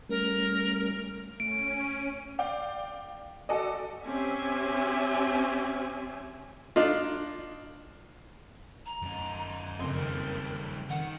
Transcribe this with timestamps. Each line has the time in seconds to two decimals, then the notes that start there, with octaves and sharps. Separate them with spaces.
0.09 G3 A3 C#4 A#4
1.40 A3 C#4 D7 D#7
2.39 D5 F5 G5
3.49 F#4 A4 D5 D#5
4.05 C4 C#4 G4 E5 G#5
6.76 D4 D#4 F4
8.86 A#5
9.02 F#2 D#4
9.79 F#1 F2 C6
9.93 D#3 G3 A#4
10.90 D#3 F#5